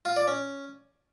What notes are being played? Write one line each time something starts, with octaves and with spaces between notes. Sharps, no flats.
F4
D5
C#4